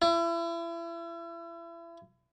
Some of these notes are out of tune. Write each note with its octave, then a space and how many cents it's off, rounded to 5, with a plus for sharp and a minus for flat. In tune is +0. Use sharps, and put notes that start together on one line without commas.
E4 +35